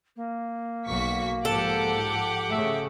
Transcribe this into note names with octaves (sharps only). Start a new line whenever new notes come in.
A#3
B1 F#4 C#6 B6
G#2 F3 G4 A4 F#5 D6
C#3 A3 E5